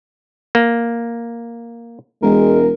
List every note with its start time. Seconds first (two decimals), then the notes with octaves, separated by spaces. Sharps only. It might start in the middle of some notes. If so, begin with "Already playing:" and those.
0.55 A#3
2.22 E1 G#3 A#4